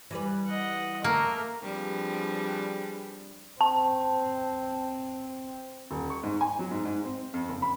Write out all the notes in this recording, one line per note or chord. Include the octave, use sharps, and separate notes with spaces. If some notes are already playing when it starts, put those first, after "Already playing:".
E3 G3 B4
D#5 F#5
A3 A#3 A#4
F3 G3 C4 D4 G#4 B4
C4 A5
D#1
C#6
G#2
G#5
F#3
G#2
G#2
C4
F2
F#1
B5